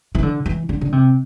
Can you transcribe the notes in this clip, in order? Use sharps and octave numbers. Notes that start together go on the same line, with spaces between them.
E3
D3
E3
D3
D3
C3